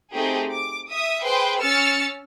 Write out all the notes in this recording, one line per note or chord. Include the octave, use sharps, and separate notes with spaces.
A3 C4 D#4 G4 G#4
D6
E5 D#6
G#4 B4 C5 G5 C6
C#4 E6 F6 A6 C#7